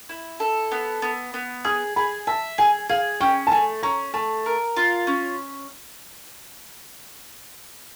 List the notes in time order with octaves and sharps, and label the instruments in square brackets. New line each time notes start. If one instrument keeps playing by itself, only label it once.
[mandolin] E4
A4
B3
B3
B3
[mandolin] G#4 [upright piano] D#6
[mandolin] G#4 [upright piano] B5
[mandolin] E5 [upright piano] A5
[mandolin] G#4 [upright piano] G#5
[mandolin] G#4 [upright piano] F5
[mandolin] C#4 [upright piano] G5
[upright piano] A5
[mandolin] A3 [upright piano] G#5
[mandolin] C#4 [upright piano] A#5
[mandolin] A3 [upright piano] A5
[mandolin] A#4
F4
C#4